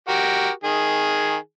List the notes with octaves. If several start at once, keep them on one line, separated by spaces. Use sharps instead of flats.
F#4 G4 A#4
D#3 G#4